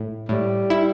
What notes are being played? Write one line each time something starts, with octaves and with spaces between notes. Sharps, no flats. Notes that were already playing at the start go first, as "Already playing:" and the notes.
Already playing: A2
A2 G3
E4